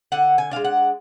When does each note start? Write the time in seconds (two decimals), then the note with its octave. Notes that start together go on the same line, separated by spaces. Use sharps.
0.12 D3 F#5
0.38 G#5
0.51 G#3 D4 F5
0.64 F#5